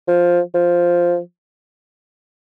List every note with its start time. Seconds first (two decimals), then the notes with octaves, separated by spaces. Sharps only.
0.08 F3
0.54 F3